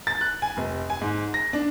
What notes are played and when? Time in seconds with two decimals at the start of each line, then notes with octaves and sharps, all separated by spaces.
0.07 A6
0.21 F#6
0.42 G#5
0.57 F1
0.90 G#5
1.01 G#2
1.34 A#6
1.53 D4